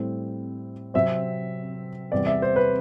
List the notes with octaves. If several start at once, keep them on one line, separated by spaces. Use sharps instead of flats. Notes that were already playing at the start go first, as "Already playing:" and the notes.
Already playing: A2 G3 C4
C3 F#3 C4 E5
E2 C3 G3 D5
E5
C5
B4